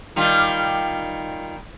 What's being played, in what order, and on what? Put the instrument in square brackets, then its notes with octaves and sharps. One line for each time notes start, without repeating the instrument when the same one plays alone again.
[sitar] D#3 G3 F4